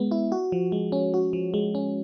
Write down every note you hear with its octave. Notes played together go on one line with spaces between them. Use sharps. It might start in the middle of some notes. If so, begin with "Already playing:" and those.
Already playing: G#3 B3
E4
F#4
F3
G#3
C#4
F#4
F3
G#3
C#4